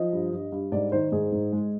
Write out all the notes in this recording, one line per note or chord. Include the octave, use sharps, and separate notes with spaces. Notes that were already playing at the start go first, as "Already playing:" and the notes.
Already playing: F3 D#5
G2
G2
G2
G#2 D5
D#3 C5
G#2 G#4
G#2
G#3